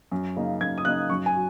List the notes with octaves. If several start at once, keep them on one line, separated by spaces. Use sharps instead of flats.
F#2
C#3 A#3 D#4
F#2 G#6
D#6
C#3 A#3 D#4 F#6
F#2 C#6
G#5
F#3